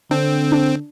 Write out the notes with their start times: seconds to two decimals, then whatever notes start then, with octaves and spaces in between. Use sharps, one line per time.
0.11 D3 C4 D4
0.52 D4